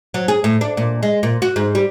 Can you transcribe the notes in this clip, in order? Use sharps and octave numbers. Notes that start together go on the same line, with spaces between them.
F#3
G#4
A2
D4
A#2
G#3
A#2
F#4
G#2
G3